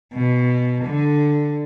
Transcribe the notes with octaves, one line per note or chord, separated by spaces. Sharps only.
B2
D3